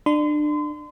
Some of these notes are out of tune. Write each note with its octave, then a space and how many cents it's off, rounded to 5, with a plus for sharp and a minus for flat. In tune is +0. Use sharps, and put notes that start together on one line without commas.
D4 +30 C6 -35